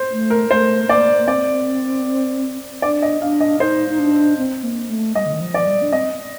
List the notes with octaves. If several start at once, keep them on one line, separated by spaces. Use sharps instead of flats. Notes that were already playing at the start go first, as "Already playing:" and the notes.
Already playing: C5
A3
A#4
A3 C5
A#3 D5
A#3
C4 D5
D4 D5
D#5
D4 F5
D#5
D#4 C5
D#4
D4
C4
A#3
A3
G3 D#5
D3
D#3
F3
D5
G3
D4
C4 D#5